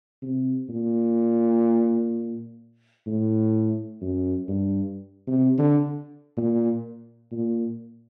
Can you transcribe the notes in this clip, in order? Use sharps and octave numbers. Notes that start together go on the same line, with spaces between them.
C3
A#2
A2
F#2
G2
C3
D3
A#2
A#2